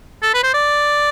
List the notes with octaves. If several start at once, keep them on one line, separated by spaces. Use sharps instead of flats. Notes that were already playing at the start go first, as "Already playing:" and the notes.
A4
B4
C5
D5